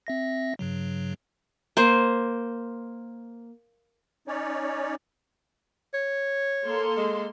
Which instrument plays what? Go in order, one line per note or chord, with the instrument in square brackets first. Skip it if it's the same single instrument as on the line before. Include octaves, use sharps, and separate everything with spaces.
[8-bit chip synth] C4 E5 A#6
G2 C#3 F#3
[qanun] A#3 C5
[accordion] C#4 D#4 C#5 D5
[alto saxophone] C#5
[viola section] A#3 A4 C6
[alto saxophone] G#3